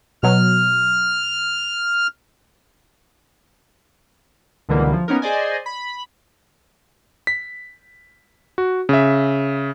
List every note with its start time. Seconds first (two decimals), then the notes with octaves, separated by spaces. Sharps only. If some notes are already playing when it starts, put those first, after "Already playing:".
0.23 B2 F#3 F6
4.69 C#2 B2 D3 E3 G3 A#3
4.93 F3
5.08 A#3 B3 C#4 D#4 A#4
5.22 G#4 C5 D5 D#5 G#5
5.66 B5
7.27 B6
8.58 F#4
8.89 C#3 E5